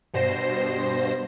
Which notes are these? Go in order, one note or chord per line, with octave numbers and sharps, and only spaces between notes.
G2 B2 C5 A#6 C7 E7